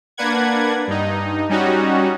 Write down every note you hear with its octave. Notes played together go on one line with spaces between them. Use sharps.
A#3 D4 B4 F#5 G#6
G2 D#4
G3 C#4 D#4 F#4